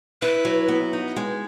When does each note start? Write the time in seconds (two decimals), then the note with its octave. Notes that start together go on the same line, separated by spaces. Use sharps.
0.22 E4 B4
0.45 F#3
0.68 B3
0.93 D#4
1.16 G#3